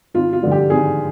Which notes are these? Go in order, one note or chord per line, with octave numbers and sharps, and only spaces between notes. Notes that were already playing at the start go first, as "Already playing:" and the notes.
G#1 F4
F4
G2 D3 F3
G4
G#1 G#4